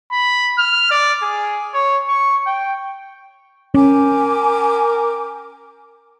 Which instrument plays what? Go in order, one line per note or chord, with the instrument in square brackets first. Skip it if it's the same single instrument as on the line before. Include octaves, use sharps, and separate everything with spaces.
[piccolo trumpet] B5
F6
D5
G#4
C#5
C#6
G5
[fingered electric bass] C#4 [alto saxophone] A#4 [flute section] G5 G#5 D6